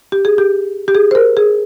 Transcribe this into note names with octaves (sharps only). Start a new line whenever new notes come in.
G4
G#4
G4
G4
G#4
C5
A#4
G#4